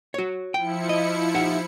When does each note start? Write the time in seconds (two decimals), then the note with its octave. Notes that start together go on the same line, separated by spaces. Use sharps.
0.14 F#4 C#5
0.54 F3 E4 G5 C#7
0.89 D#5
1.34 D#4 G4 F#5